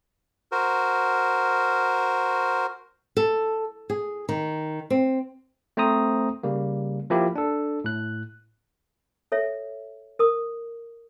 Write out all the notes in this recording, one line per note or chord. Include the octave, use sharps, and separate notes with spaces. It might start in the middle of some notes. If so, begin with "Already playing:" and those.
F#4 A#4 C5
A4
G#4
D#3
C4
A3 C4 C5 A#5 D#6
C#3 G3 A#3
F3 A#3 E4 G4
D4 A4
A2 F#6
A4 C#5 E5
A#4 D#6